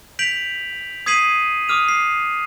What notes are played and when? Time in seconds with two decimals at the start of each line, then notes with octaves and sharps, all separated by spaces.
0.19 G6 B6 D7 F7 F#7
1.06 D#6 G#6 B6 C7 D#7 F#7
1.68 D6 D#6 F6 D#7 F7
1.89 C7